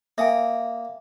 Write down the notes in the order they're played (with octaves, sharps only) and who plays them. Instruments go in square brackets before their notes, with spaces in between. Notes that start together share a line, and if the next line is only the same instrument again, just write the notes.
[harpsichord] A#3 D#6 [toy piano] E5 G5 G#5